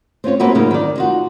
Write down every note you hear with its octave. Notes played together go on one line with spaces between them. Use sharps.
C4 C#4 F4 C#5
A#3 C4 F#4 B4 E5
C#3 F#3 A#3 D#4 F4
D#3 D5
D#4 F4 F#4